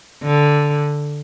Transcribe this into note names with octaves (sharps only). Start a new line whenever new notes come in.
D3